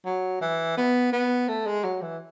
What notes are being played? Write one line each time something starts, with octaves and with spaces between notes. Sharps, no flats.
F#3
E3
B3
B3
A3
G#3
F#3
E3